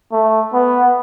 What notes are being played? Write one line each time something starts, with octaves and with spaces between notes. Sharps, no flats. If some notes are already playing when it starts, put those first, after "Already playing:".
A3
B3